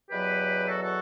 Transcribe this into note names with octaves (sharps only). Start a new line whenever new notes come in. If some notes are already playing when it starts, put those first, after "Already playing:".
E2 B2 F#3 G4 B4
F#4 A4
F#4 A4